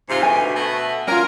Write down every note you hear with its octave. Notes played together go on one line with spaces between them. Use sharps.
G#2 C3 F4
D2 B2 E5 G#5
B2 A3 B3
C#4 F4 A#4